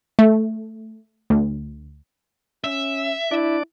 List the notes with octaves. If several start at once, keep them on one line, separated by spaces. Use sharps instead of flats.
A3
D2
C#4 E5
D4 E4 D5